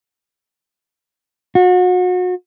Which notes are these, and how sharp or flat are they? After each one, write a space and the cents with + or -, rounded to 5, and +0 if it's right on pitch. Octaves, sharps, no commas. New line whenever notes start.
F#4 -35